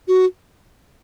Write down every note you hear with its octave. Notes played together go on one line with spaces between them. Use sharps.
F#4